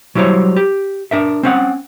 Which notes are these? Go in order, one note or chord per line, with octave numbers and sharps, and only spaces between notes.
F#3 G3 E4 C5 C#5
G4
D4 A#4 E5
C4 C#4 F#5